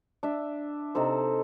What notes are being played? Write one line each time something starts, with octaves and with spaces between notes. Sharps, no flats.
D4 E5
C3 D#4 A4 C5